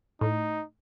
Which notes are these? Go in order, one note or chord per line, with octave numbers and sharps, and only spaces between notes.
A2 D#4